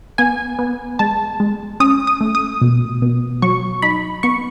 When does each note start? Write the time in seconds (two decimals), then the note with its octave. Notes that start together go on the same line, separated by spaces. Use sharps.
0.18 B3 G#5
0.59 B3
0.99 G#3 A5
1.40 G#3
1.80 C#4 D#6
2.07 D#6
2.21 A3
2.35 D#6
2.61 B2
3.02 B2
3.42 F#3 C#6
3.82 D#4 B5
4.23 B3 C#6